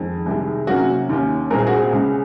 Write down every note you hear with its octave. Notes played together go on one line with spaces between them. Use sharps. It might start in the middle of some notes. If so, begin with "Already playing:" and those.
Already playing: F2 D#3 G#3
C2 C3 D#3 G#3
C3 F#3 A#3 C#4 F#4
D#2 D#3 A#3 C#4
C2 A#2 G#3 C4 A#4
G#4
F#4
G#4
C#2 C#3 G#3